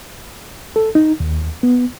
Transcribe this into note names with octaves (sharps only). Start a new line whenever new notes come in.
A4
D#4
D#2
B3